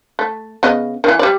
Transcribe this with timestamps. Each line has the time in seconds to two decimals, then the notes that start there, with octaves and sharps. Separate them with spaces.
0.19 A3
0.63 C#3 B3 D#5
1.04 D#3 E3
1.19 G3 D5